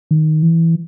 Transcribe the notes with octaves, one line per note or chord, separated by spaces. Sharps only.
D#3
E3